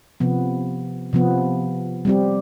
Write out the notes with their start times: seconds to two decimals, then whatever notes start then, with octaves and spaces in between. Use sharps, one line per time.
0.20 C3 F3 B3
1.13 C3 F3 B3
2.05 G3 C4 G4